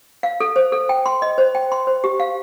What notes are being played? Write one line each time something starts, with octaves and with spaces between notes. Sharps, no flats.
F5
A4
C5
A4
G5
C6
D#5
C5
G5
C6
C5
G4
F5